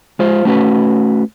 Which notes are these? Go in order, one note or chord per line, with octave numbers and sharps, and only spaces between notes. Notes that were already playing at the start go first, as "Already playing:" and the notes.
G#3 F4 C5
A3 C#4 F#4 B4